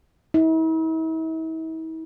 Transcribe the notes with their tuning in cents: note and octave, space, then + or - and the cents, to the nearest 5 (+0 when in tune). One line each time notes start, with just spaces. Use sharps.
E4 -45